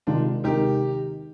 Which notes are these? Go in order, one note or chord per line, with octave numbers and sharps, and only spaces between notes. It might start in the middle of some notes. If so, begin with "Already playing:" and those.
C3 D#3 G#3 D4 D#4 F4
C3 D#3 G#3 D#4 G4 A#4